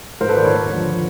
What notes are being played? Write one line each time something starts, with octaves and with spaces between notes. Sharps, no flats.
G#2 A#4 C5
A4 B4
D#3 C5 D5
B4 C#5
D#2
D3 F3